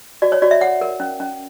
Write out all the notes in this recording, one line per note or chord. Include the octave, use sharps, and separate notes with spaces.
F#4 D5
C#5
F#4 D5
E5
C#5 F#5
A#4
C#4
C#4